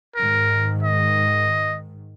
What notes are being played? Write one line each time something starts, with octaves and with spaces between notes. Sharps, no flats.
G#2 D#3 A#4
D#5